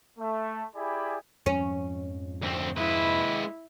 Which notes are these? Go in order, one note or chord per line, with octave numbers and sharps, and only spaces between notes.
A3
E4 G4 G#4 D5 G#5 B5
F2 G#2 F3 C#4
D2 C4
G#3 E4 B4